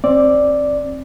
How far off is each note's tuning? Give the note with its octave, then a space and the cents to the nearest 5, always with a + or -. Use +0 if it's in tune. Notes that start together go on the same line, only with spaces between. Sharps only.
C4 +20 D5 +0